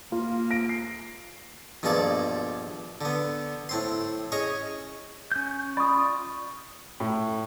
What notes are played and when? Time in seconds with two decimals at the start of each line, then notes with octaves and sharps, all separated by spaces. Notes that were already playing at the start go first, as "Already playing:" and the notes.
0.12 A#3 F4
0.51 A#6 D7
0.69 C7
1.83 A#1 G2 B2 G#3 A4 D5
3.01 D3 B3
3.69 A2 C4 C6
4.32 C#4 G#4 C#5 D#5
5.32 C#4 G6
5.77 F4 D5 B5 C#6 D#6
7.00 A2